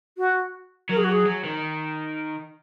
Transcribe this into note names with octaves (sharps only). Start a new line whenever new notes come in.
F#4
F#3 A#4
G#4
F#4
G#4
F#3
D#3